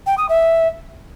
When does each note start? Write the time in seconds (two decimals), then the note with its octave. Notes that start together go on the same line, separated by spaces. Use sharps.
0.06 G5
0.18 D#6
0.29 E5